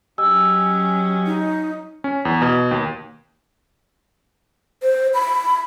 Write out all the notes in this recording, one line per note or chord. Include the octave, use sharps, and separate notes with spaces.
F#3 C#4 G4 D#5 G#5 E6
D#4
C#4
E2
B2
D#2
C5
B5